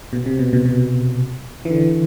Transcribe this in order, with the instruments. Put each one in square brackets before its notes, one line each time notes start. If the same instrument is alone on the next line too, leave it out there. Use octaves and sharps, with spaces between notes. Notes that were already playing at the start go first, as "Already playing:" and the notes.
[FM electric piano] B2
C3
B2
B2
B2
E3
D3